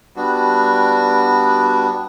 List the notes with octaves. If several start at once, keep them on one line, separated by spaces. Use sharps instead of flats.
G3 B3 D4 F#4